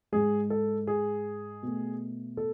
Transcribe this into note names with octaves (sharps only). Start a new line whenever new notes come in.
G#2 G#3 G#4
A4
G#4
B2 A3
A4